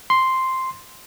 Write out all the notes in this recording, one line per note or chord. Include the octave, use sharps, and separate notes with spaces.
C6